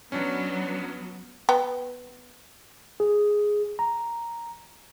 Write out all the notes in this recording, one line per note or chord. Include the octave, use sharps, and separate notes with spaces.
F#3 B3 C#4 D4
B3 G5
G#4
A#5